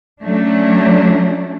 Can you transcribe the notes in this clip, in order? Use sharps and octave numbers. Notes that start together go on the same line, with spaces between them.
F#3 A3 C#4 D4